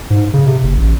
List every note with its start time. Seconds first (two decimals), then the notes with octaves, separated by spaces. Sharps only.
0.10 G#2
0.34 C#3
0.46 C3
0.63 F#1
0.78 A1